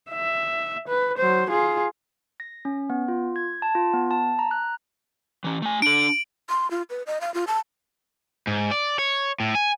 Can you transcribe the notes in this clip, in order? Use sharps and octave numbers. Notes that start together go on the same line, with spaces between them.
E5
B4
F#3 C5
F4 G#4
A#6
C#4
B3
F4
G#6
A5
F4
B3
A5
A#5
F#6
E3 C#4
A3 G#5
D4 A4 D7 F#7
C6
F4
B4
D#5
F5
F4
A5
G#2
D5
C#5
A2
G#5